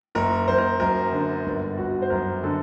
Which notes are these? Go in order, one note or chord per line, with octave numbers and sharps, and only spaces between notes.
F#1 A#4
F#1 C5
A#4
F#2 A#4
D3
G1
G1 F#4
C5
F#2 A#4
D3 A4